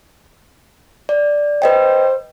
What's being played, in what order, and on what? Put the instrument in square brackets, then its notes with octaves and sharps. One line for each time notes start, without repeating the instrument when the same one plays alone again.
[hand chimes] D5
[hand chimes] B4 D#5 G5 [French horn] C5